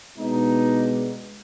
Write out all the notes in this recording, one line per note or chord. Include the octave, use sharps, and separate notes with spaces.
B2 G#3 B3 D4 D#4